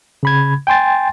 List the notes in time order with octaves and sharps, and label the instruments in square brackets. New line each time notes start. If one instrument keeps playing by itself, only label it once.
[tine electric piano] C#3 B5 G#6
G5 G#5 C6 A6